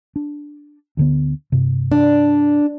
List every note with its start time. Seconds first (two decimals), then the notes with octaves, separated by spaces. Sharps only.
0.16 D4
0.97 D2 D3 B3
1.52 G2 C3
1.92 D4